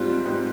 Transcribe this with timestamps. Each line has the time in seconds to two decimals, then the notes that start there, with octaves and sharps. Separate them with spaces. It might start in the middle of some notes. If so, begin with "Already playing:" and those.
Already playing: G#2 G3 C4 F4
0.25 G#2 G3 C4